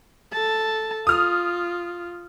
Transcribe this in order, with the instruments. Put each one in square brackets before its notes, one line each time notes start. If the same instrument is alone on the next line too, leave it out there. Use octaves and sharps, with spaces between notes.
[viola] A4 A5
[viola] F4 [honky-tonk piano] D#6 F6